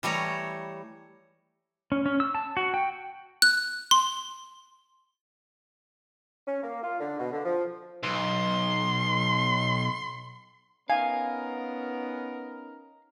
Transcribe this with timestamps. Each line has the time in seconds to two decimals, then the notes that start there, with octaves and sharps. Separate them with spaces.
0.03 E3 G3 A3 C#5 A#5
1.92 C#4
2.06 C#4
2.20 E6
2.35 A5
2.57 F#4
2.74 G5
3.42 F#6
3.91 C6
6.47 C#4
6.63 A#3
6.83 F4
7.00 D3
7.19 B2
7.33 D3
7.45 F3
8.04 B1 C6
10.90 B3 C#4 D#4 A#4 F5 G#5